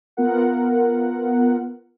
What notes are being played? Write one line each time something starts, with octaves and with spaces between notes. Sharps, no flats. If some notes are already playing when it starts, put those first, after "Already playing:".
B3 F4 A#4 F#5